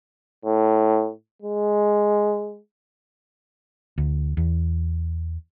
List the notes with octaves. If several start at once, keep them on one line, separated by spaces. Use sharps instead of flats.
A2
G#3
D2
E2